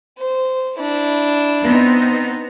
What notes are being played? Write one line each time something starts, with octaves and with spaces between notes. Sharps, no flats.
C5
D4 E4
B3 C4 D#4